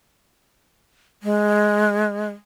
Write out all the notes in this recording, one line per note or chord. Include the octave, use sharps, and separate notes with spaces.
G#3